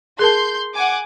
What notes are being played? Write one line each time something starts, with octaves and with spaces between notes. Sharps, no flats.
G#4 A#4 A5 C6 G6
F#5 G#5 D6